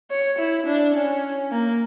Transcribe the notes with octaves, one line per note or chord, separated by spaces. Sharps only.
C#5
E4
D4
C#4
A#3